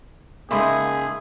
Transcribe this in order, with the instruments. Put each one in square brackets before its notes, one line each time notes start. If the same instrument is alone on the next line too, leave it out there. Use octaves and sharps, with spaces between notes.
[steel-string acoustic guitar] C#3 G#3 D#4 [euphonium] A#3 [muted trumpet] G#4 [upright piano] E5 B5 C6